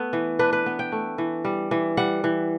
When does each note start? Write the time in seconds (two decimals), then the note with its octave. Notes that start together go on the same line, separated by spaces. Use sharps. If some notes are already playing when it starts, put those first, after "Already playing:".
Already playing: A3 B3
0.13 E3
0.39 D4 B4
0.53 B4
0.66 B3
0.79 G5
0.92 A3
1.18 E3
1.45 G3
1.71 E3
1.97 G3 F#5
2.24 E3